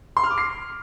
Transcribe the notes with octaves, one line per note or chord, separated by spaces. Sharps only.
C6
F6
D6
C7